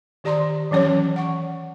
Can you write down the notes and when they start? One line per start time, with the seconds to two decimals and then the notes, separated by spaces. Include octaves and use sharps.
0.24 D#3 G4 D5 A#5 C6
0.71 E3 F#3 C#4 C#5
1.16 F#5 C#6